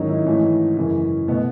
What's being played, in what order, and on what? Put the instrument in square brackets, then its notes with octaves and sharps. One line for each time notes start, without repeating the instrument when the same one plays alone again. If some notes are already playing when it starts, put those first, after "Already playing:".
Already playing: [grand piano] G#2 D#3 F#3 C#4 D#4
E4
G#2 E3 A3 C#4
F#2 C#3 E3
B2 A3 B3